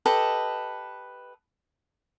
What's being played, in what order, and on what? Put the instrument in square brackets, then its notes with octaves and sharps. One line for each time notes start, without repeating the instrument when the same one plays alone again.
[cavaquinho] G4 A4 B4 D#5